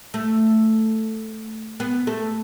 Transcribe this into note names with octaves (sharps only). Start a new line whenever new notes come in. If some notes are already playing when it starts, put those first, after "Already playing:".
A3
B3
A3